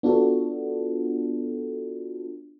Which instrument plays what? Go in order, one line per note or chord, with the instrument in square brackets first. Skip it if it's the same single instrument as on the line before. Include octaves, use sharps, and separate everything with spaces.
[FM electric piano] B3 D4 F4 F#4 A4